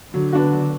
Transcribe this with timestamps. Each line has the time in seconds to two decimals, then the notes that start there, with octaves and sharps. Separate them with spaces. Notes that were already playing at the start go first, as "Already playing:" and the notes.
0.13 D3 F#3
0.33 B3 D4 F#4
0.52 F#3